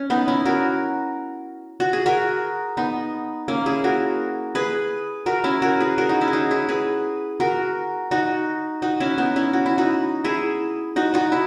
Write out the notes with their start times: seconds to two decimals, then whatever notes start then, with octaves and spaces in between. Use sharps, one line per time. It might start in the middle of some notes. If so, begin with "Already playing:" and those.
Already playing: C#4
0.10 B3 D#4
0.28 C#4 E4
0.45 F#4 A#4
1.80 F#4
1.93 G#4
2.06 F#4 A#4
2.77 B3 D#4
3.48 A#3 C#4
3.66 E4 G#4
3.84 F#4 A#4
4.55 G#4 B4
5.26 F#4 A#4
5.44 C#4 E4
5.62 F#4 A#4
5.80 G#4 B4
5.98 F#4 A#4
6.09 D#4 F#4
6.21 C#4 E4
6.28 G#4
6.33 D#4 F#4
6.51 E4 G#4
6.69 G#4 B4
7.40 F#4 A#4
8.11 D#4 F#4
8.82 D#4 F#4
9.00 C#4 E4
9.18 B3 D#4
9.36 C#4 E4
9.53 F#4
9.66 E4
9.78 D#4 F#4
10.24 E4 G#4
10.96 D#4 F#4
11.14 D#4 F#4
11.32 E4